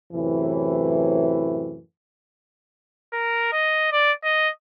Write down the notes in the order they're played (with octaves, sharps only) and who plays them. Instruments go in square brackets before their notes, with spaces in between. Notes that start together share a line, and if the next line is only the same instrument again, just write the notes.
[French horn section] F#2 A2 C3 E3
[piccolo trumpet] A#4
D#5
D5
D#5